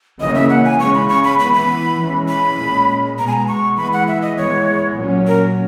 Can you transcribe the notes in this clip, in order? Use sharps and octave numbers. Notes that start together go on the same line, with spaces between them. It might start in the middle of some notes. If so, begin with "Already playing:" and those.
C#3 E3 A#3 C#4 D#5
E5
F#5
G#5
C#3 G#3 C#4 C#6
B5
C#6
B5
E3 B3 B5
B5
E3 G#3 C#4
B5
A#2 G#3 C#4
B2 G#3 B3 A#5
G#5
A#5
C#6
E3 G#3 B3 B5
F#5
E5
D#5
E3 G#3 B3 C#5
A#2 F#3 C#4
A#4